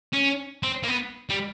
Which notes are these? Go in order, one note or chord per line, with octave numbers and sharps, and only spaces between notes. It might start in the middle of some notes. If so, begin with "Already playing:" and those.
C#4
C4
A#3
B3
G3